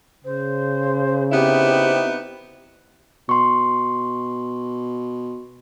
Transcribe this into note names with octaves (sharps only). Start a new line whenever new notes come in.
C#3 C5
B3 C4 D#4 E4 G4
B2 C6 C#6